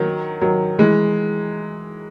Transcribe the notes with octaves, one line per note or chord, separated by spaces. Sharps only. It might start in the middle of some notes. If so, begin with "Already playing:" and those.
Already playing: D#3 F#3
D#3 F#3
E3 G#3